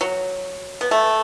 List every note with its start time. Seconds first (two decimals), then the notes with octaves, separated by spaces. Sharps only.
0.01 F#3
0.81 B3
0.91 A3